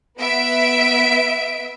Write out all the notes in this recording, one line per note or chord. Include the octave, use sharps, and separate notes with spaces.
B3 E5 D7